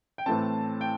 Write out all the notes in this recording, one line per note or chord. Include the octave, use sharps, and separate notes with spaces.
G5
A2 E3 A3 C4 A5
G5